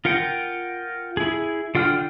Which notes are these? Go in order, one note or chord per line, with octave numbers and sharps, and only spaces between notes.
F4 A#4 F#5 G5
E4 G#4
D3 F4 F#5 G5 F6